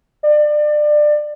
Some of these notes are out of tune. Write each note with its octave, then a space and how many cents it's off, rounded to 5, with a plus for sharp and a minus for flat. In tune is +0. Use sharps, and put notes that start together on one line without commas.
D5 +25